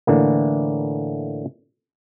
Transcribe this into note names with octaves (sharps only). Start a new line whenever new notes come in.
A2 D3 E3 A#3